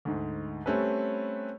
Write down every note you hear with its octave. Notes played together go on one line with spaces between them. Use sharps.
D2 G#2
G3 A3 C4 C#4 A4 B4